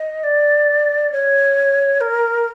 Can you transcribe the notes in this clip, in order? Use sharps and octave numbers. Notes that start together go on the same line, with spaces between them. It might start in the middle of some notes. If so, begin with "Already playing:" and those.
Already playing: D#5
D5
C#5
A#4